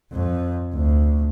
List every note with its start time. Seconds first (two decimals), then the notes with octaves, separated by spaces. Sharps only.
0.12 F2
0.74 D2